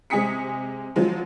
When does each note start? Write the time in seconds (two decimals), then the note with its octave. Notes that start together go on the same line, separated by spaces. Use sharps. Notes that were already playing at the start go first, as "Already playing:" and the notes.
0.10 C3 G#3 G#5 D#6 B6 C#7
0.96 F3 F#3 G#3